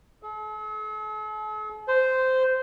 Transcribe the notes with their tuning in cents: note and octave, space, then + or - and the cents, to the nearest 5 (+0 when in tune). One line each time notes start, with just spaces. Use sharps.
A4 -45
C5 -10